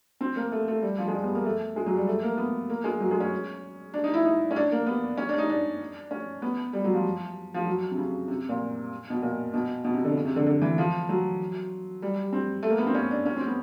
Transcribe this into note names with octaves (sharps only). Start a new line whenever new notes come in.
C4
A#3
A3
A3
G3
F3
G#3
G3
B3
A#3
A3
G#3
F#3
G3
A3
A#3
B3
A#3
G#3
F#3
G#3
C#4
D4
D#4
E4
D#4
C#4
D4
A#3
B3
C#4
D4
D#4
D4
C#4
B3
G3
F#3
F3
F3
F#3
C3
C#3
C3
A#2
B2
A#2
B2
B2
C3
D3
C#3
C3
D3
D3
E3
F3
F#3
G3
C4
A3
A#3
B3
C4
C#4
D4
C#4
C4
B3